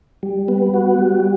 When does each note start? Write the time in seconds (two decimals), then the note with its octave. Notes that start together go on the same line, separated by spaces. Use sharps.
0.23 G3
0.48 B3
0.74 F#4
0.99 G3